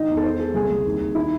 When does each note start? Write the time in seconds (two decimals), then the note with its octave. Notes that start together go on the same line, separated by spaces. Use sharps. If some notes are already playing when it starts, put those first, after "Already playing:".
Already playing: G#2 D#3 D#5
0.09 E2
0.17 A4
0.24 G#3 C5
0.39 G#3 A4
0.54 C2 G#4
0.70 C2
0.85 D#2
1.01 D#2
1.15 D#3 E4